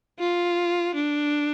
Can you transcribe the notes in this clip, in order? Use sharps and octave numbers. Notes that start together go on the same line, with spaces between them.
F4
D4